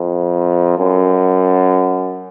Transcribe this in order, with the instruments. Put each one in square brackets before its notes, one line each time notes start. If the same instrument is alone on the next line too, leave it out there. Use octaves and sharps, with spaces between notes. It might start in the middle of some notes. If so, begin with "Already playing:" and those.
Already playing: [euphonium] F2
F#2